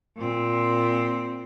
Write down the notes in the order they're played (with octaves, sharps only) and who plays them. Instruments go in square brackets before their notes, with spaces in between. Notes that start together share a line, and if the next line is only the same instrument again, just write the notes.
[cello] A#2 C4